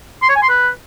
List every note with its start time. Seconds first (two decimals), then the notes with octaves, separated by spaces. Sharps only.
0.22 C6
0.29 C#5
0.36 G#5
0.43 C6
0.49 B4